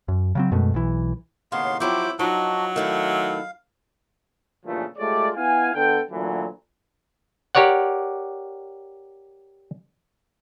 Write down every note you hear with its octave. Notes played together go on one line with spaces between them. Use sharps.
F#2
C#3 F#3 C4
F#2 B2 G#3 A3
B1 E3
D#2 A2 C#3 B3 F5 C6
F3 F#3 C4 E4 G4 C5 D6
F3 F#3 D4 D#4 F4 F#4
D#3 A3 E4 F5
G2 A#2 C#3 E3 F3 A3
G#3 A3 F4 G4 C#5 D5
B3 E4 F5 G#5
D3 B3 A4 G5
D2 A#2 E3 F#3
G4 A#4 C#5 D5 F#5